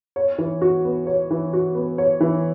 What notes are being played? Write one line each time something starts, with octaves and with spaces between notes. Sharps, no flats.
C#5
E3
F#4
B3
C#5
E3
F#4
B3
C#5
E3